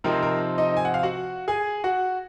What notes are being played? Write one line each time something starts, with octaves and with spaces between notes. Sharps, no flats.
C3 F3 C4 D#4 A#4
A#4
D#4 D#5
G#5
F#5
F5
F#4 F#5
G#4 G#5
F#4 F#5